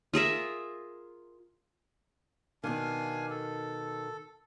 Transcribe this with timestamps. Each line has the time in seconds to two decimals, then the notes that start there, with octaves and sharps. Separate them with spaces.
0.13 F4 G#4 A#4 E5
2.64 B2 D#3 D4 F5 G#5
3.30 A4